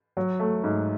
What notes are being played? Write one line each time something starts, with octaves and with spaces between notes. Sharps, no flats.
F#3
A3
G#2